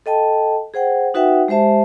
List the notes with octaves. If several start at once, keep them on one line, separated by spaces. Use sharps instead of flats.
A4 D#5 G5 A5
G#4 C5 F#5 G5
D#4 F#4 B4 E5 F#5 G5
G#3 G4 C5 E5 A5